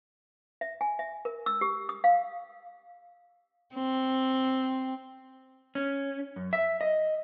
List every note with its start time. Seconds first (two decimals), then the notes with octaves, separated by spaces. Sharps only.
0.61 E5
0.81 G#5
0.99 E5
1.25 A#4
1.46 E6
1.61 G4
1.89 D#6
2.04 F5
3.74 C4
5.75 C#4
6.36 F#2
6.53 E5
6.81 D#5